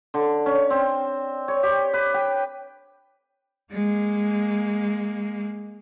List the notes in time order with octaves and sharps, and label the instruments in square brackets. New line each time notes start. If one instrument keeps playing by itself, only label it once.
[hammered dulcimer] D3
C#4
C4
C#5
G4
B4
G5
[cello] G#3 A#3